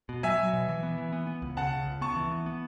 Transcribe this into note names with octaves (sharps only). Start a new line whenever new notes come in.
B2
F#3 E5 G#5
F#3
B2
E3
B3
E3
B3
B3
C#2
C#3 F#5 A5
C#3
C#2
B3 A5 C#6
E3
B3
B3